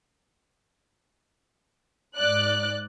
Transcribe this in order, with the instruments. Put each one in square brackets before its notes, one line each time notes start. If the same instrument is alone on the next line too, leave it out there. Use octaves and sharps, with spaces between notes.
[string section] G#2 D5 F#6